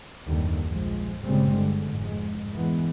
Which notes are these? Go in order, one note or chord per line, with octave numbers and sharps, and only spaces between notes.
F#1 D#2 D3 G3
A#1 F3 G#3
G1 A#2 C#3 G3 G#3 C4
G2 D3
F1 G#2 G#3
E3 G#3 B3